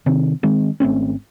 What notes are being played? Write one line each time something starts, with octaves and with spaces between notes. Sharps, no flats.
C3 D#3 C4
D#3 G#3 C4
G#1 A3 C4 C#4